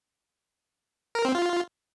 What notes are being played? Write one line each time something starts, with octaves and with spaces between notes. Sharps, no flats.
A#4
C4
F4